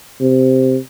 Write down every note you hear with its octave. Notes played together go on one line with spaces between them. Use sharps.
C3